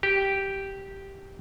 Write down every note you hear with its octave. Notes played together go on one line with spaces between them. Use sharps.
G4